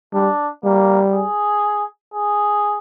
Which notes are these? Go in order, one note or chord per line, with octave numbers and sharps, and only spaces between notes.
G3 D4
G3 A#3
G#4
G#4